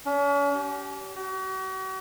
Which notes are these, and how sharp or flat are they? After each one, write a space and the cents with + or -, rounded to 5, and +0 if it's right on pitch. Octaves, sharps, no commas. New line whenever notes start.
C#4 +40
G4 -30
F#4 +40